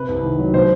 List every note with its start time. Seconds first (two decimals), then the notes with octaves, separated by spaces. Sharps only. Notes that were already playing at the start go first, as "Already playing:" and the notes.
Already playing: C3 B4
0.08 C2
0.24 D#3
0.38 F#3
0.53 B2 C5